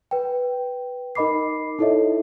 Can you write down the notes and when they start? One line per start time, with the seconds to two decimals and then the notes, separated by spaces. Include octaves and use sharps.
0.11 B4 G5
1.15 D#4 A#4 D#5 B5 D6 C7
1.79 D#4 E4 A4 C#5 D#5 E5